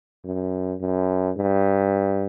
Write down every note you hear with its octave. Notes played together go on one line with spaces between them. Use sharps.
F#2
F#2
G2